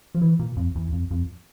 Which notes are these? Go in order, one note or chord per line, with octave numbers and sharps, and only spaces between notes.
F3
E3
A#2
F2
E2
F2
F2